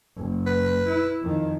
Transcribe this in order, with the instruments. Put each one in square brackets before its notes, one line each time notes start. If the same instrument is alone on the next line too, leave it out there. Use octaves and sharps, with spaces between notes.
[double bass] F#1
[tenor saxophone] B4
[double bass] E4
F2 D#3